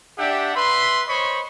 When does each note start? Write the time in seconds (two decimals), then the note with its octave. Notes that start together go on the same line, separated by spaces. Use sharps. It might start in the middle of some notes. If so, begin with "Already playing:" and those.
0.19 D4 G4 E5 F#5 G5
0.55 B4 E5 B5 C6
1.08 C5 C#5 D#5 B5 C#6